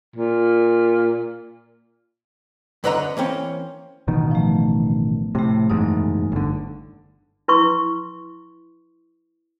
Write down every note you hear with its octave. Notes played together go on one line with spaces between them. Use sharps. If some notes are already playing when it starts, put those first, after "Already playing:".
A#2
F#2 D3 B4 D#5 F#5 A#5
E3 A#3 C4 C#4
A1 B2 D#3
F3 A3
A2 C3 A3 G5
F#1 E2 G#2 D#4
G1 D3
E4 B4 C6 C#6